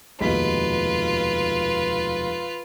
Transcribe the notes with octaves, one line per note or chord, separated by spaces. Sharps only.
F1 D#2 B2 G#3 F4 B4 B5 B6